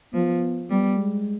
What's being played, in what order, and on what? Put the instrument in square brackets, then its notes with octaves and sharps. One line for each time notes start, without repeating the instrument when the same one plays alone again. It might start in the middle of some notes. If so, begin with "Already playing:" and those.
[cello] F3 [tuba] B3
[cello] G3 [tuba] B3
[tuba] G#3